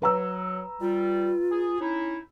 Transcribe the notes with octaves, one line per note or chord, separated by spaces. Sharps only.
F#3 B4 A#5 E6
G3 F4
G#4
C#4 D#4 E4